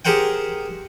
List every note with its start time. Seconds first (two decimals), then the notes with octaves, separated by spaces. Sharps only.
0.05 G4 G#4 A#4 C5 F#5 G5